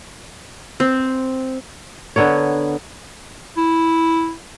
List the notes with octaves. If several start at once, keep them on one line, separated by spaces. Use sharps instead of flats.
C4
D3 B3 A#4 C#5
E4